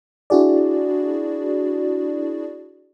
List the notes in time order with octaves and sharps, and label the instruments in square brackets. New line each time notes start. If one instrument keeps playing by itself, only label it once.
[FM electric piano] D4 E4 F#4 G#4 D5